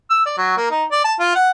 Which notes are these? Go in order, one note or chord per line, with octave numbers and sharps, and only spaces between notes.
E6
D5
F#3
A#3
D#4
D5
A5
F4
F#5